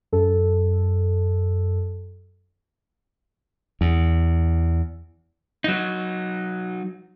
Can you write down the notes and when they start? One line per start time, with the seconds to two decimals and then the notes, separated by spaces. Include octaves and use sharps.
0.12 F#2 A4
3.81 E2
5.64 F#3 D#4